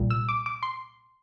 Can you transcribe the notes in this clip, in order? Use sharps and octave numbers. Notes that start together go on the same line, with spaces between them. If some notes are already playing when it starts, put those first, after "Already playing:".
Already playing: C2 A#2 G3
E6
D6
D6
C6